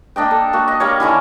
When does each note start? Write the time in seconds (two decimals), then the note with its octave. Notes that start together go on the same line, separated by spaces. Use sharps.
0.16 A#3 D4 D#5 G5
0.31 A4
0.53 A#3 F#4
0.68 D#5
0.80 G3 A#3 C#5
1.00 D3 D#3 C#4 E4